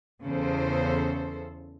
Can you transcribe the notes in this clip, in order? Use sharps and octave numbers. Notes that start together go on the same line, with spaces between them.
E2 C#3 A4 C5